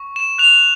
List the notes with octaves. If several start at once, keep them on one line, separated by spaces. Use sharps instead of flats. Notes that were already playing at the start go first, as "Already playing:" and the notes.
Already playing: C#6
E7
F#6 F7